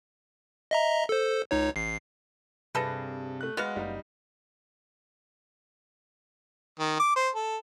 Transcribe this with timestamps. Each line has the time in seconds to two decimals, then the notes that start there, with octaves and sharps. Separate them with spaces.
0.71 D#5 E5 A#5
1.09 A4 C5
1.51 C#2 D#4 C#5
1.76 A1 C7
2.75 G2 C3 G#4 A4 B4 A#6
3.41 A3 F#6
3.57 G#3 B3 F#4 F5
3.76 F#1 G3 D#4
6.79 D#3
7.00 D6
7.16 C5
7.35 A4